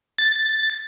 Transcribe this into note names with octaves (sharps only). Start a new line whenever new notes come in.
A6